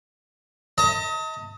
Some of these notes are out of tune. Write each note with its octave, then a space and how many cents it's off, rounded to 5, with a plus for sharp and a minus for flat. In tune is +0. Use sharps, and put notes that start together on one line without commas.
D#5 +35 A5 +45